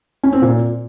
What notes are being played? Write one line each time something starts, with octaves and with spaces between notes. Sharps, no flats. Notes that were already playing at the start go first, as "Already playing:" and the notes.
C#4
C4
A#2